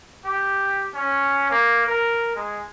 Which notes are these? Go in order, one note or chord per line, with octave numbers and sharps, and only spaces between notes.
G4
C#4
A#3
A#4
G#3